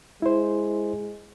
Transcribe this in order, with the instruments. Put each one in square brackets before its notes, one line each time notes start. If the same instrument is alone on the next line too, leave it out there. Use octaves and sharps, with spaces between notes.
[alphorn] G#3 [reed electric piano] E4 C5